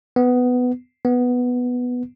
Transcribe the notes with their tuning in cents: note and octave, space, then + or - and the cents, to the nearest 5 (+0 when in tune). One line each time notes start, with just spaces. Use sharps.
B3 +10
B3 +0